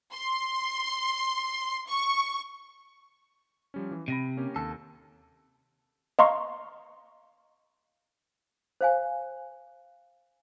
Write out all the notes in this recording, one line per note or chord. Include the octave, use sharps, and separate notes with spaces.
C6
C#6
F3 G3 C#4
E3
C3 B5 A#6 D#7
A#3 C#4 G4
D#2 A4
D#5 F5 A#5 C6 C#6
C5 F5 G#5